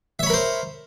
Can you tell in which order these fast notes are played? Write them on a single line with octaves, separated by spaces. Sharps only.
E5 C#5 B5 A#4 C5